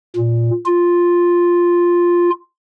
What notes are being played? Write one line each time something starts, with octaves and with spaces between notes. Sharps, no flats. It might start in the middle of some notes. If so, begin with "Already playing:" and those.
A#2
F4